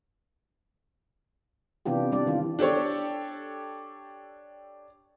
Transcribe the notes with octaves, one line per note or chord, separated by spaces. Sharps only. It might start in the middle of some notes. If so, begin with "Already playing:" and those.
C3 E3 B3 D4 F4 G4
E3 G3 D4 D5
D#3 E3 F4
D4 G4 A4 C#5